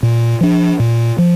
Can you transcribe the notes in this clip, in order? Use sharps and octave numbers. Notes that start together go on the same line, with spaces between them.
A#2
F3 D4
A#2
F3